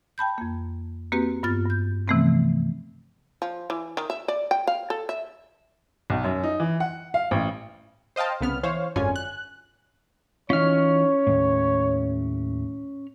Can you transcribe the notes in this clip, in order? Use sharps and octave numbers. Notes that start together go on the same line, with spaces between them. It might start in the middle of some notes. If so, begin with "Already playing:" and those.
G5 A5 B5 G6
F2 A#3
A#3 C4 F#4 G4 B4
G2 B3 F4 A6
G2 G6
C3 E3 F3 A3 B3 C4
F3
E3
D#3
E5
D5
G5
F5
A4
E5
B1
F#2
D#4
E3
F#5
F5
A1
C5 D#5 F5 G5 A5
C2 C#3 B3 F6
E3 C5 C#5 F5
G#1 F#2 D3 C#4 F4 G#5
F#6
E3 C#4 D#4 F4 C#5 F6
D#2 A2